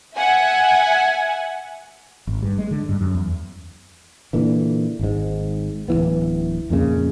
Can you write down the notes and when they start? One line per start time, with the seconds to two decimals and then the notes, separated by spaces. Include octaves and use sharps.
0.16 E5 F#5 G#5
2.27 G#1
2.42 G2
2.58 G#3
2.71 D3
2.89 G2
3.01 F#2
3.15 E2
4.33 A#2 D3 E3
4.99 G#1 G#2
5.88 D1 C#2 E3 B3
6.70 F2 A#2 C#3 G#3